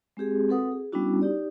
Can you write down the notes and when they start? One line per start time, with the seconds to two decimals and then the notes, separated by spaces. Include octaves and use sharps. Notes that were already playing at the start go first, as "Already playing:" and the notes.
0.17 G#3 C4 G4 G#4
0.49 C4 F#4 A4 B4 F#5 D#6
0.72 G#4
0.92 G3 B3 C#4 D4 E4 F#4
1.21 D#4 G4 D5